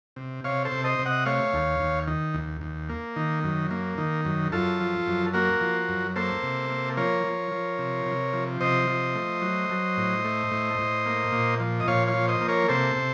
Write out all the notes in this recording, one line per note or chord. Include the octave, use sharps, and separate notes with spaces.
C3
C3 C#5 F5
A4 C5
C3
C5 D#5
C3
D#5 F#5
A3 C#5 F5
D#2
D#2
D#3
D#2
D#2
A#3
D#3
F#2
A#3
D#3
F#2
F#2 F4 A4
F3
F#2
A#3 F#4 A#4
F3
F#2
A#3 A4 C5
C3
A#3
F3 A#4 C#5
F3
F3
C3
C3
F3
C3 C5 D#5
F3
A3
F#3
F#3
A2
A3
A2
A2
A#3
A#2
F3
D#5
A#2 C#5 F5
C#5 F5
F3
C5 D#5
A#3
A#4 C#5
C3 A4 C5
C3